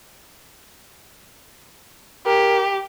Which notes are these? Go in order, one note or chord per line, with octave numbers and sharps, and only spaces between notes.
G4 A#4